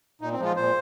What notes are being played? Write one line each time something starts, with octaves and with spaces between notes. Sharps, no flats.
A#2 D#4
C4
F3 G#3 F4
A#2 C5